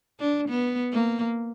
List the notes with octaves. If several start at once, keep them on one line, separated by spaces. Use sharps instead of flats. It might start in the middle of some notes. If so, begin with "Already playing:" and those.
D4
B3
A#3